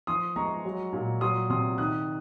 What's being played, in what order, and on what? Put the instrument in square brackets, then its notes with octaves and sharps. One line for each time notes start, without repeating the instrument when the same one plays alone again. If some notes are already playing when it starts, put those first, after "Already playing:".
[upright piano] F3 C6 D#6
G#3 A#5 C#6
F#3
A#2
F#3 C6 D#6
C3 C6 D#6
D#3 D#6 F#6